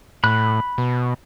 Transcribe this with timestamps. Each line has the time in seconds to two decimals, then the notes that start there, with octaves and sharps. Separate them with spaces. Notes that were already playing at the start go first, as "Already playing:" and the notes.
0.24 A2 B5 F#6
0.78 B2